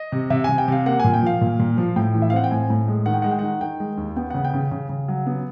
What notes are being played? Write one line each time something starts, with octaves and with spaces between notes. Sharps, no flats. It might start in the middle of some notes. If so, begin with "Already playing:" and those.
Already playing: D#5
C3
C3 E5
C3 G#5
G5
C3 F5
A#3 F#5
A#2 G#5
G5
F3 F5
A#2
A#2
F3
A2 G5
E3
E5
F5
C4 F#5
G5
A2 G#5
A2
G#3
D#3 F#5
G5
G#3 F#5
G5
D#3 F#5
D#3 G5
G#3
D#2
B3 G5
C#3 F#5
G5
C#3
C#3
C#3
F#3
B3